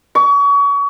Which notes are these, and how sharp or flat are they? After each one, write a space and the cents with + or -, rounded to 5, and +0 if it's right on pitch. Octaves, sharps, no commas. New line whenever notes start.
C#6 +35